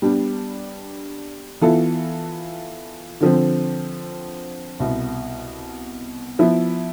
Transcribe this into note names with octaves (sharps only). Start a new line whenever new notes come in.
G3 B3 D4
E3 B3 F4 A4
D3 F3 C4
C2 B2 B3
F3 B3 E4